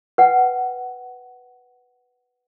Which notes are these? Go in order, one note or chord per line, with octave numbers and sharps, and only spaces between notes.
B4 F#5 G5